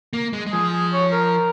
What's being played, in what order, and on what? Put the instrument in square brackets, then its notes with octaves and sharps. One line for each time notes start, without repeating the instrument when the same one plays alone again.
[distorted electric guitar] A#3
G#3
G#3
[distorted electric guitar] F3 [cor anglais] G#4
[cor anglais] G#4
C#5
A#4